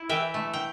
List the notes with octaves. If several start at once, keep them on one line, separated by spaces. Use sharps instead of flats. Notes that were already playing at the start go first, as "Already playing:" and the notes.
Already playing: E4
E3 E5 G5
A3
G5